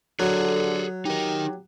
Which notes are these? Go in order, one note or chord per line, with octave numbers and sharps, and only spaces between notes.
D3 F#3 G#4 A4
D#4 G4 A#4